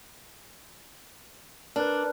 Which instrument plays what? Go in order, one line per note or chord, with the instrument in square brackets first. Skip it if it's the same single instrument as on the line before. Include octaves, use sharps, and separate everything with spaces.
[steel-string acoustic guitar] D4 [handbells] A#4 B4